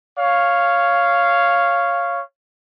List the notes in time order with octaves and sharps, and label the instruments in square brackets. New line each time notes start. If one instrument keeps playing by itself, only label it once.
[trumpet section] C#5 F5